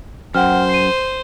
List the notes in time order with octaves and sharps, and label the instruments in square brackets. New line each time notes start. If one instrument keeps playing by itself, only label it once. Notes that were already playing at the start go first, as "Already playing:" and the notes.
[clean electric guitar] F#2 [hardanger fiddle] C5 [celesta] F#5 G5 F6
[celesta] C7 D#7